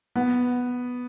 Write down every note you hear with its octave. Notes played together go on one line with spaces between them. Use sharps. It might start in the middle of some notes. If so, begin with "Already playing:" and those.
B3